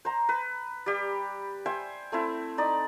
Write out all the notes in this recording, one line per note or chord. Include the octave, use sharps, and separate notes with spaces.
C5 A#5
B4
G3 G4
C5 E5 G5 G#5
A3 C4 E4
D#4 D5